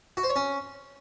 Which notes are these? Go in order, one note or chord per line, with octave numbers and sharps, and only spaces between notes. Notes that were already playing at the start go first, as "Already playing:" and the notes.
F#4
C5
C#5
C#4